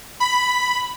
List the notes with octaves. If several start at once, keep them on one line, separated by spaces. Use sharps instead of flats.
B5